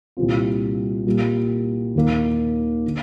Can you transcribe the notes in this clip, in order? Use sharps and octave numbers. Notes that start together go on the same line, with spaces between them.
C2 A#2 G3 C4 F4
A#2 G3 A#3
D#2 D#3 A#3
D3